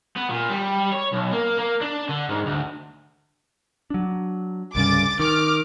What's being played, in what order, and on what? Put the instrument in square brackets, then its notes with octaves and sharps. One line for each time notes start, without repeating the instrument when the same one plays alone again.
[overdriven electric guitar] B3
A#2
G3
C#5
B1
A#3
A#3
D4
D3
G#2
D2
[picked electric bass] F#3 D4
[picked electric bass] C2 G2 C#3 [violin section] D6 A6
[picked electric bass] D#3 [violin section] D6 F6